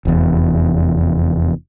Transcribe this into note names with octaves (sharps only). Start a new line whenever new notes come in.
F1 E2